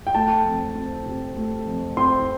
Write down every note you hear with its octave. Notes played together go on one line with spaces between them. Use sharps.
G5
A3 A5
F2
C4
C3
A3
F2
C4 C6